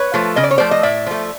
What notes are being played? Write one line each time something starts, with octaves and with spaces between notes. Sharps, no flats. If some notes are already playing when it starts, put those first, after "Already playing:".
Already playing: B4 C#5
F3 A3
C#3 D#5
D5
C#5
F3 A3 C5 D5
D#5
A2 D5 E5
F3 A3